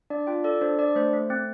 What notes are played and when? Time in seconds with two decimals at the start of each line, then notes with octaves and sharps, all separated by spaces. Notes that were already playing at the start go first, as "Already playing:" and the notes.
0.10 D4 D5
0.27 F4 G5
0.44 A4 D5
0.61 D4 C5
0.78 D4 D5
0.96 A3 C5
1.13 A3
1.30 C4